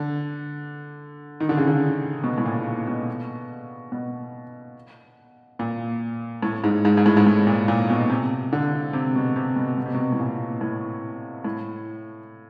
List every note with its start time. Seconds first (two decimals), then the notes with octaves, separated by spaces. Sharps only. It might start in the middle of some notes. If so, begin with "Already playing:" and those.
Already playing: D3
1.40 D#3
1.49 D3
1.57 C#3
1.67 D3
2.24 B2
2.38 A2
2.45 A#2
2.87 B2
3.92 B2
5.59 A#2
6.43 A2
6.64 G#2
6.85 G#2
6.97 G#2
7.06 A2
7.17 G#2
7.27 A2
7.47 A#2
7.68 A#2
7.90 B2
8.10 C3
8.53 D3
8.93 C3
9.15 B2
9.36 C3
9.56 B2
9.78 B2
9.86 C3
9.94 B2
10.12 A2
10.20 A#2
10.61 A2
11.44 A2